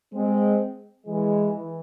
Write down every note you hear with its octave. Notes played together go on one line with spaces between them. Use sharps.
G#3 C4
E3 G#3
E3